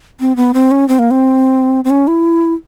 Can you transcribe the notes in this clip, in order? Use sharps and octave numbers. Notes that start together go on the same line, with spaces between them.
C4
B3
C4
C#4
C4
A#3
C4
C4
C#4
E4